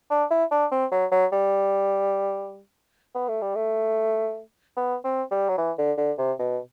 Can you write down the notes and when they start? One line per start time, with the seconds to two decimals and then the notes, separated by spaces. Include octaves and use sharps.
0.10 D4
0.30 E4
0.51 D4
0.71 C4
0.91 F#3
1.11 F#3
1.32 G3
3.14 B3
3.28 A3
3.41 G3
3.55 A3
4.76 B3
5.04 C4
5.31 G3
5.49 F#3
5.57 E3
5.78 D3
5.97 D3
6.18 C3
6.39 B2